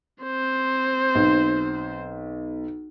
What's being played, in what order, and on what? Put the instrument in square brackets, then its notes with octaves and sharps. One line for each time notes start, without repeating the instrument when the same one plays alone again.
[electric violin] C4 C5
[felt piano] B1